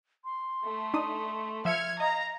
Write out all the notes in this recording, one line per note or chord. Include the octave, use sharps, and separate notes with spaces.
C6
A3
D4 D#4 D#6
F3 E5 F6 G#6 C#7
D#5 F5 A#5